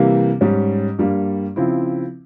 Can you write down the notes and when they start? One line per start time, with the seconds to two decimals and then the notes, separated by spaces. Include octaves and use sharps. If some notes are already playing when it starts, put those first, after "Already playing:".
Already playing: C3 E3 G3 A#3
0.41 G#2 G3 C#4
0.98 G2 G3 A#3
1.56 C#3 F3 C4 E4